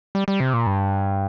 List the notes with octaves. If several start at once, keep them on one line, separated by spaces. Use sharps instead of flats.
G3
G3
C3
A#2
G2